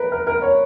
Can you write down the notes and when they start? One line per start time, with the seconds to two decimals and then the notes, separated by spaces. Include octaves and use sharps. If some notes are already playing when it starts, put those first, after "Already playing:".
Already playing: A#4 B4
0.12 A#4
0.27 A#4
0.42 C#5